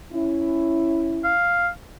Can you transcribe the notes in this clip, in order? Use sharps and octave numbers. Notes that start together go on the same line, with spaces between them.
C#4 E4
F5